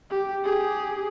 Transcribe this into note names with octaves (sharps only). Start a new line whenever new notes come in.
G4
G4 G#4